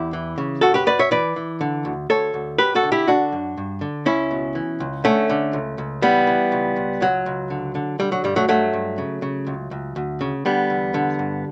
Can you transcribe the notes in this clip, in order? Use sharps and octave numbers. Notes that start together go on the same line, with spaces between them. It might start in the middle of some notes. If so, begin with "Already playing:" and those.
Already playing: E2 E4 G4
E3
C#3
F#2 F#4 A4
G4 B4
F#2 B4 D5
C#5 E5
E3 B4 D5
E3
D3
D2
D2 A4 C#5
D2
F#2 G4 B4
F#4 A4
D3
E4 G4
D3 D4 F#4
F#2
G2
D3
C#2 C#4 E4
B2
E3
C#2
D3 A3 C#4
D3
C#2
C#2
E3 G3 B3
E3
C#2
C#2
C#2 F#3
C#2
D3
D3
D3 G3
F#3
G2 G3
F#3 A3
G2 F#3 A3
G2
C#3
C#3
C#2
C#2
D2
C#3
D3 G3 B3
E2
D3
G2